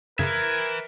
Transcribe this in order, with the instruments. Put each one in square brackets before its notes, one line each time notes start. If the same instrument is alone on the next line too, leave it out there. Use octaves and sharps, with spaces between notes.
[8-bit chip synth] F#2 C#3 [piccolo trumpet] A#4 [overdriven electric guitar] B4 E5 [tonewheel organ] G#6